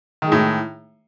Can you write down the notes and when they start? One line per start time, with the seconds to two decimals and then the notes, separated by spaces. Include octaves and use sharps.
0.22 D#3
0.27 G#3
0.32 A2